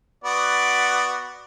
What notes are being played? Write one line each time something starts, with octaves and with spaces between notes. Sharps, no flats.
B3 F#4 D5